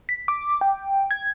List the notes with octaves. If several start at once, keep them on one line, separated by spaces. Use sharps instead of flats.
B6
D6
G5
G#6